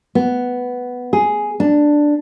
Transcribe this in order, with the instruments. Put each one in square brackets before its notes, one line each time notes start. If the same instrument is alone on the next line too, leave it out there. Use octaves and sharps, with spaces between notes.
[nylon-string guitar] B3
G#4
D4